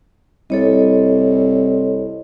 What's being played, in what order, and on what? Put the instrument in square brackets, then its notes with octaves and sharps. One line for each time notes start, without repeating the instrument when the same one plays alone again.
[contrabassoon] C2 [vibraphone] A4 C#5 D#5